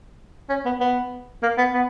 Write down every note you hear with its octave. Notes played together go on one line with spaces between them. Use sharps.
C#4
B3
B3
A#3
B3
B3